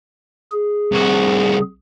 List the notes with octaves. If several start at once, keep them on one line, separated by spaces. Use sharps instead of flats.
G#4
C2 F#4